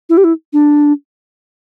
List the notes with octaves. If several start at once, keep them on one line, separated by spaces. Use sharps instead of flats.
E4
G4
E4
D4